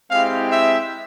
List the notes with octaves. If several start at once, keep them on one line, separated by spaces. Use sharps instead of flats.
G#3 C4 E4 G4 F5
E5